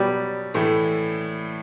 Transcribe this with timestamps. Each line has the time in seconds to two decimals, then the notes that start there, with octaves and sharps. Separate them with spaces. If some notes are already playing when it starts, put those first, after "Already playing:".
Already playing: B2 F#3 G3 B3
0.54 A2 E3 A3